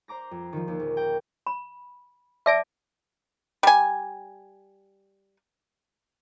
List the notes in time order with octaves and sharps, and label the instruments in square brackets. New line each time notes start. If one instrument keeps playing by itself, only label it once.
[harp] C5 A#5 D6 A#6
F2
D#3 F3
D#2
A#1
G5 A#6
[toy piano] B5
[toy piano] D5 A5 D6 [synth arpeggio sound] E5 A#6 D7
[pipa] G3 G#5